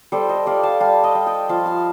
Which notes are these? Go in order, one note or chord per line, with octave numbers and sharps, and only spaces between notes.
G3 A4 C5
C5 D#5
G3 D5 F5
F5 A5
G3 F5 A5
D#5 G5
G3
D#5 G5
F3 F5 A5
F5 A5